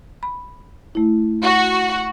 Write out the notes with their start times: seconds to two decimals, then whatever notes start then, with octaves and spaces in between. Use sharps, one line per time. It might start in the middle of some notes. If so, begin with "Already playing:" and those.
0.23 B5
0.95 A3 E4
1.43 F#4